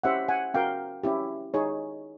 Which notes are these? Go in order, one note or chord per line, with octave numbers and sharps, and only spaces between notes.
C#4 E4 G4 C5 E5 F#5
F#5 G#5
C#4 F#4 A#4 F5 G5
C#4 E4 G4
D#4 G#4 C#5